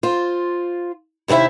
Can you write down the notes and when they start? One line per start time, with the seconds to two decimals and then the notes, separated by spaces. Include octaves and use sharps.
0.03 F4 C5
1.28 D#2 C3 C4 E4 E5